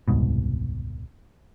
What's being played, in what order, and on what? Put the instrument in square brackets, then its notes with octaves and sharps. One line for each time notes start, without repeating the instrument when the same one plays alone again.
[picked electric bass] D#1 C2 G#2 B2